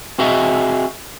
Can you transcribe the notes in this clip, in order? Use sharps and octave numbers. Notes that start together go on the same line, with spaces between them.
C4 F#4 G#4 D#5 E5